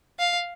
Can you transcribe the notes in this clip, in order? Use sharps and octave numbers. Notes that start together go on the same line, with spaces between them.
F5